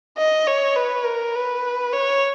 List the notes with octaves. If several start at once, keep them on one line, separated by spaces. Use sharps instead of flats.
D#5
C#5
B4
A#4
B4
C#5